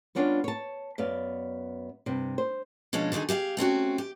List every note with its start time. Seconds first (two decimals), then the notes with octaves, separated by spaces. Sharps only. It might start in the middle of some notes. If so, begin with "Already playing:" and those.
0.15 G3 B3 C#4 D4 F4
0.44 C#5 A5
0.98 F#2 B3 D5 F5
2.06 G2 C3
2.38 C5
2.93 B2 F3 G#3 C#4 D4
3.12 D3 D#3 F#3 D#4 G#4
3.29 G4 G#4 E5 F5
3.57 A3 C4 C#4 F#4
3.98 G4